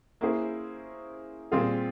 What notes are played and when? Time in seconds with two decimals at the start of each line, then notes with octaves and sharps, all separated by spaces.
0.21 A#3 C#4 E4 G#4 C5
1.52 A#2 G3 C4 F4 G#4